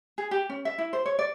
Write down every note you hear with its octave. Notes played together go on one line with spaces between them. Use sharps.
G#4
G4
C#4
E5
E4
C5
C#5
D5